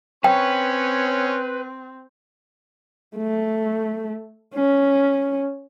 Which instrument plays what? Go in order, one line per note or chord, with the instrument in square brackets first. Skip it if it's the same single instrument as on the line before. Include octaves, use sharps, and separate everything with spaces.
[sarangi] C4 [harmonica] C#4 C#5 C#6 [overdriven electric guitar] B4 [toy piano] G5
[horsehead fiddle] A3
C#4